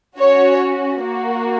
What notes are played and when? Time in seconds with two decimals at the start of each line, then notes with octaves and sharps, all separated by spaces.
0.18 C#4 F#4 C#5
1.01 A#3 F#4